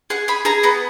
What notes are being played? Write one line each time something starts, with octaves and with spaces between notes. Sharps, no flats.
G#4 F#5
G#4 B5
G#4 A#5
B3 A#5